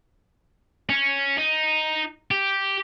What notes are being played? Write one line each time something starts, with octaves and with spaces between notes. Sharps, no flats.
C#4
D#4
G4